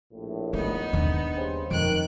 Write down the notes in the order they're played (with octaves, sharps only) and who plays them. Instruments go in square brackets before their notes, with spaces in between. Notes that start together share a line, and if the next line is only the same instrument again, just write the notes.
[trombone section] A#1 A2
[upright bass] A3 [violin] B3 D#4
[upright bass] D#2 D4
[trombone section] C#3 G3 C4
[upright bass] F2 [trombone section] D#3 [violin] F#6 D7